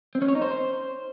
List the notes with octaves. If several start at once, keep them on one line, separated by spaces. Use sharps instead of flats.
C4
C#4
C#5
D#4
C5